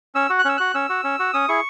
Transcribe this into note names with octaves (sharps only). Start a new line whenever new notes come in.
C#4 E6
F#4
F#6
C#4 E6
F#4 F#6
C#4 E6
F#4
C#4
F#4
C#4 D#6
E4 G#4 C#6